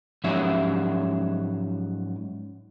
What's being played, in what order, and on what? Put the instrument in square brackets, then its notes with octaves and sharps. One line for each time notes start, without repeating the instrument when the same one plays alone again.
[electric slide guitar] G#2 F3 F#3 C#4 G4 E5